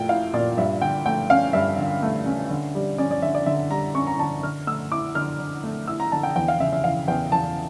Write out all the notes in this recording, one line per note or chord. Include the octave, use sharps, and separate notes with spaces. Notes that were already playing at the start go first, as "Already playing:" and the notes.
Already playing: A#2 A3 G5
E4 F5
A#2 D5
G2 E5
D3 G5
A3 G5
C#4 F5
G2 E5
D3
A3
C#4
D3
G3
C#4 D5
D5
D3 E5
D5
D3 E5
G3 A#5
C#4 C#6
A#5
D3 A5
D3 F6
A3 E6
E4 D6
D3 F6
D3
A3
E4 E6
A#5
D3 A5
G5
E2 G5
F5
C#3 E5
E5
E3 F5
E2 G5
E2 A5